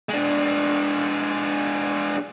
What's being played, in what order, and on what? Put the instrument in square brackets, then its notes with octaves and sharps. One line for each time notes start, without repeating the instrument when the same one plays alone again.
[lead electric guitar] G#3 D4